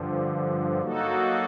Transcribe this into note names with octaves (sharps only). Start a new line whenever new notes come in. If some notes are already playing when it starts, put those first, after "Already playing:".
Already playing: G2 D3 F3
F#3 A#3 D#4 F#4 A4